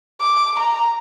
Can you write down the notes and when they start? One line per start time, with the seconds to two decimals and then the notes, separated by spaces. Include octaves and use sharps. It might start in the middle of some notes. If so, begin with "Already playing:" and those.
0.21 D6
0.60 A#5